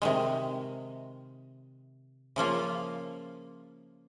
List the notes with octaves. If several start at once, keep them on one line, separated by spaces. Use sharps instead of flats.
C3 D#3 G#3
C#3 F3 A#3 F4